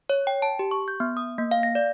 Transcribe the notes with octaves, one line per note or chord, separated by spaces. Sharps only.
C#5
G5
A5
G4
C#6
G6
B3
D#6
A#3
F5
A#6
D5